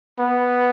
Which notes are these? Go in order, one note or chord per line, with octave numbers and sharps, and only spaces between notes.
B3